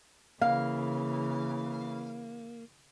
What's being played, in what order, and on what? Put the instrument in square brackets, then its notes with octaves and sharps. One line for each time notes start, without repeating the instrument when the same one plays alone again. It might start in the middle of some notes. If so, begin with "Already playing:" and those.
[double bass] C#3 E3 [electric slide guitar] A#3 [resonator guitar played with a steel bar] F5